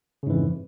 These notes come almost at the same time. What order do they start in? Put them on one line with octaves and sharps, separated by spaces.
C#3 G#2 E3 F2